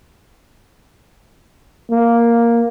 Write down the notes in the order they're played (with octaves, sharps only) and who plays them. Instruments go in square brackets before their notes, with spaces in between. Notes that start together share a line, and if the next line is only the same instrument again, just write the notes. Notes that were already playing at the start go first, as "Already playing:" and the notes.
[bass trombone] A#3